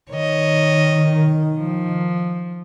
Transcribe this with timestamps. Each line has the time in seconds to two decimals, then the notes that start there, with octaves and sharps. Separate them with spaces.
0.11 D#3 C#5 D#5
1.57 F3